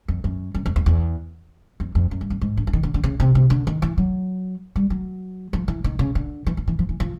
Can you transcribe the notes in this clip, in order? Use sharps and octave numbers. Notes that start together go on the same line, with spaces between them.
F2
F#2
F#2
F2
E2
E2
F2
F2
F#2
G2
F#2
G#2
D3
E3
D#3
D3
D3
C#3
C3
C3
D3
D#3
E3
F#3
G3
F#3
F3
E3
D#3
C#3
D3
E3
F3
E3
F3
E3
F3